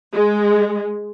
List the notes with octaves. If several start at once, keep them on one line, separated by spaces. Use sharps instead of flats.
G#3